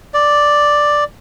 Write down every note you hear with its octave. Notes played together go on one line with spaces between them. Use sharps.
D5